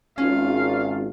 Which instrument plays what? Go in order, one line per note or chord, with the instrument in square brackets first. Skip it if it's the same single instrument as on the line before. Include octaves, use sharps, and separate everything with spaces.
[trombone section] G#1 [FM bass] C#4 [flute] F4 [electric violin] F5